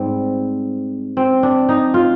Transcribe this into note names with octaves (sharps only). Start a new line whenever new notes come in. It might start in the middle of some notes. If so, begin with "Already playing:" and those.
Already playing: G#2 G3 C4
C4
D4
D#4
F4